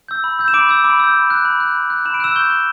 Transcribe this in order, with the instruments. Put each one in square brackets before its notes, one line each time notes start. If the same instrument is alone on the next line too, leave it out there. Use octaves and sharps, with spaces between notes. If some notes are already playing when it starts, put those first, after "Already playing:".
[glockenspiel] E6 G6
B5
E6 G6
E7
B5 D6 D7
E6 G6
B5 D6 D7
E6 G6
B5
F#6
B5
F#6
B5
F#6
B5 E7
D7
E6 F#6 E7
C#6 G6 G7
G6